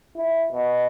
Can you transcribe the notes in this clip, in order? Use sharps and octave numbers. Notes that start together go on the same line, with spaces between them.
E4
B2